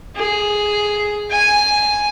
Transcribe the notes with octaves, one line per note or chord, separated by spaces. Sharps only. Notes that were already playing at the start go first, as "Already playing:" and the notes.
G#4
G#5